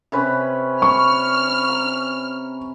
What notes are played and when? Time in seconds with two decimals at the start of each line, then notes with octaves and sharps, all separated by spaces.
0.12 C3 C#4 B4
0.82 C#6 F6
1.69 A#5